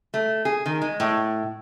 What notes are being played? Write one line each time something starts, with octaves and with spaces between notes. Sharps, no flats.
A3
G#4
D#3
G#3
A2